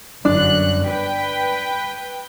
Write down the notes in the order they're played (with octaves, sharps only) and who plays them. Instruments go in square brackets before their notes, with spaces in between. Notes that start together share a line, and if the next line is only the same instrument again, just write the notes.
[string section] G1 F#2 F#6 [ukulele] D4
[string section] B4 G5